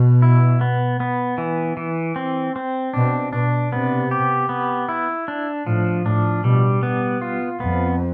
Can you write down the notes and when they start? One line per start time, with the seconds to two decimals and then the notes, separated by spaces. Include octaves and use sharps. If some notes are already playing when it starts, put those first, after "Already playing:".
Already playing: B2
0.22 E4
0.61 B3
1.00 B3
1.38 E3
1.77 E3
2.16 C4
2.56 C4
2.94 B2 D4
3.32 B2 D4
3.72 C3 B3
4.11 G4
4.49 B3
4.89 E4
5.28 D4
5.66 A2 F3
6.05 A2 D4
6.44 B2 G3
6.83 B3
7.22 F4
7.60 F2 B3